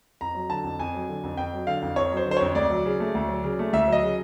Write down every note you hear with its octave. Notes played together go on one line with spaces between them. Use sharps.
F2 A#5
F#3
D3 A5
F2
F2 G#5
F#3
D3
F2
F2 G5
F#3
D3 F5
F2
F2 C#5
F#3
C5
D3
C5
F2 C#5
D2 D5
F#3
C#3
A3
D2
F#3
C#3
A3
D2 E5
F#3 D#5
C#3